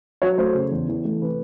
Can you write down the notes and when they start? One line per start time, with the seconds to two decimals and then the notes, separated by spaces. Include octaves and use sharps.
0.22 F#3 C#5
0.38 A3 C5
0.55 C#3
0.71 E2
0.89 E3
1.05 A3
1.21 C3 B4